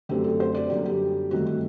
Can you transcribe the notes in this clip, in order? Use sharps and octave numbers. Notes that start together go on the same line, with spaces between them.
F#2 D3 A3 C4 G4
A4
C5
D5
F#2 D3 G3 A#3 G4
G4
G2 D#3 A3 C4 F#4
F#4